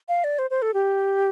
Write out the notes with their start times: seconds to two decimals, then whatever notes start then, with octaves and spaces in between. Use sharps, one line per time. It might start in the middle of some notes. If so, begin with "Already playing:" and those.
0.09 F5
0.24 D5
0.39 C5
0.50 C5
0.62 A4
0.74 G4